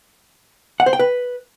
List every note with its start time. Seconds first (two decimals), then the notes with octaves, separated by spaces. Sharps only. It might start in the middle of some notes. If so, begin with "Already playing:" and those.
0.80 F#5
0.86 C5
0.93 G5
0.99 B4